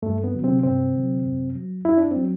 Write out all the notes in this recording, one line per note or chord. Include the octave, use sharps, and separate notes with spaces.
G2 A3
B3
D3 F#3
C3 C4
G2 C3 C4
D3 F#3
F#2
F#3
F#2 E4
D4
F#3 C4